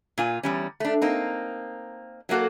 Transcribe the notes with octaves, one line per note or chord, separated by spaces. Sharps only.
A#2 F4 G#5
E2 G3 C#4
A3 D4
A#3 C4 D#4
F#3 A3 A#3 F#4 A4